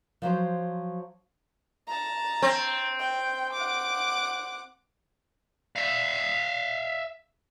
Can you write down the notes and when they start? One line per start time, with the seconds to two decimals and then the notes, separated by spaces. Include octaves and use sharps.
0.22 F3 F#3 C5
1.87 A5 A#5
2.42 C4
3.00 G5
3.53 F#5 D6
5.76 E5 F5